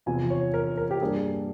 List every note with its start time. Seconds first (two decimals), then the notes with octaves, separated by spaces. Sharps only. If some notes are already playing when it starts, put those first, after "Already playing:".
0.06 E2 C3 F3 G#5
0.30 C#5
0.54 A#4
0.77 A#4
0.91 G4
1.01 G2 G3 A#3 G#4
1.33 G#4